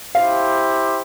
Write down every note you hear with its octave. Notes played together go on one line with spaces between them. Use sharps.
E4 G4 C5 F5